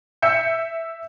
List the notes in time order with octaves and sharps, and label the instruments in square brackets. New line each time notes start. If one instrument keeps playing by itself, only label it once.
[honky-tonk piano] E5 E6 G6 C#7